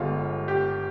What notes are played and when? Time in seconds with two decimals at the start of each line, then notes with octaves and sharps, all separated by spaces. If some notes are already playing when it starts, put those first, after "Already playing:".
Already playing: G1 G2 D3 G#3 F4
0.48 G4